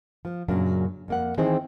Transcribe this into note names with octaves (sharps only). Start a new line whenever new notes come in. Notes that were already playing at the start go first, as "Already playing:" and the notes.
F3
F#2 A#2 C#3 F#3 A#3 D4
F2 A#3 F#5
D#3 E3 C4 D#4 G#4 C5